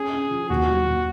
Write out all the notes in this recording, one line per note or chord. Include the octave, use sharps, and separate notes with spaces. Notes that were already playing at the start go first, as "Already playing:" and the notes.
Already playing: C#4 G#4
C#4
F3
D#2 F#4
F#3
D#2